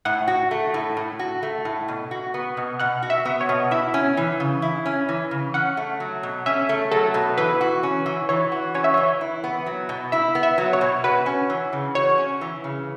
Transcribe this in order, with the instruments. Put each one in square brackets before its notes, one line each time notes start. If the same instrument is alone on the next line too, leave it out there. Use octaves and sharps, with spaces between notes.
[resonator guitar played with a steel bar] A2 [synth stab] F#5
[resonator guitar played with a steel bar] F#4
A3
A2
A2
F#4
A3
A2
B2
F#4
B3
B2
[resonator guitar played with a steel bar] B2 [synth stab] F#5
[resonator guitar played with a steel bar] F#4
[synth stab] E5
[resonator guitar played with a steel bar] B3
[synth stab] C#5
[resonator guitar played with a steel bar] B2
[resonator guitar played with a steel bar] E4 [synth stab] E5
[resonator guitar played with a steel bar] C#4
E3
C#3
E4
C#4
E3
C#3
[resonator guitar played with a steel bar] C#4 [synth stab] F#5
[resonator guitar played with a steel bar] A3
F#3
B2
[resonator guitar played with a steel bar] C#4 [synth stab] E5
[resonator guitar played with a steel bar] A3
[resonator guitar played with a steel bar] F#3 [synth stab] A4
[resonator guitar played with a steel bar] B2
[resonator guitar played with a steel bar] E3 [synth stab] B4
[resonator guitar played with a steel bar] F#4
C#4
E3
[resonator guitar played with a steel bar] E3 [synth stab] C#5
[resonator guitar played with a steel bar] F#4
[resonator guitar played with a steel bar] C#4 [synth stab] C#5
[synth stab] E5
[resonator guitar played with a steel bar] E3 [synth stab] C#5
[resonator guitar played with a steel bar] E4
B3
F#3
B2
[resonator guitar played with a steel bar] E4 [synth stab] E5
[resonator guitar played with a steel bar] B3
[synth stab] E5
[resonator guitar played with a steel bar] F#3
[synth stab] C#5
[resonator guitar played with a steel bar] B2
[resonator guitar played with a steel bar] F#4 [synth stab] B4
[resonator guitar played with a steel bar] C#4
E3
C#3
[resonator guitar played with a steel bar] F#4 [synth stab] C#5
[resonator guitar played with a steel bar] C#4
E3
C#3